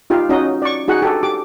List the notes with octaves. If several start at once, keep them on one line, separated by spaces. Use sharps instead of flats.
D#4 F4 G4 F5
C#4 D#4 F#4 D#5
D5 C#6
D#4 F#4 G#4 F#5
G4 A4
G4 D6